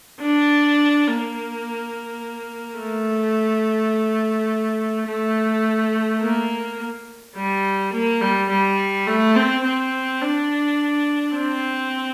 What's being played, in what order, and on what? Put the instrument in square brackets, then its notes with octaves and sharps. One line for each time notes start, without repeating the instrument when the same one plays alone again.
[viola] D4
A#3
A3
A3
A#3
G3
A#3
G3
G3
A3
C4
C4
D4
C4